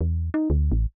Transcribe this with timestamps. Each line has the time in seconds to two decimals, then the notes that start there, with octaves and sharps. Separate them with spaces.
0.01 E2
0.34 D#4
0.50 D2
0.72 A1